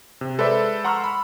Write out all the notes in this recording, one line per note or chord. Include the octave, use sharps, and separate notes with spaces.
C3
G#3 A4 B4 C5 D5 E5
F#5 A#5 C6 C#6 E6 F6
B5